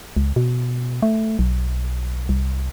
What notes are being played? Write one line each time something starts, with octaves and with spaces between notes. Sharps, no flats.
C#2
B2
A3
B1
C2